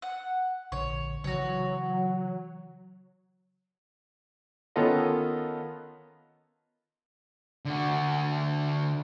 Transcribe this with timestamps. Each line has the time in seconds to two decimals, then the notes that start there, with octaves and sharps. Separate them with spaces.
0.02 F#5
0.72 A#1 D3 C#5
1.24 C#3 E3 F#3 F#4 C#5
4.76 D#3 B3 C#4 F4 A4 D#5
7.65 D3 F#4